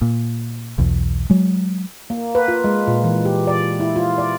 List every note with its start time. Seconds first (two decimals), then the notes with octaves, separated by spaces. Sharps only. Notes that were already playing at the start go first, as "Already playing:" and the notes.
0.02 A#2
0.78 B1 E2
1.30 F#3 G#3
2.10 A#3
2.35 B4
2.48 F4
2.64 G#3
2.87 A#2
3.04 E3
3.25 G4
3.47 D5
3.80 E4
3.96 F4
4.18 D5